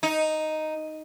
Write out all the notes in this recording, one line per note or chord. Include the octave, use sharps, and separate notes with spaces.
D#4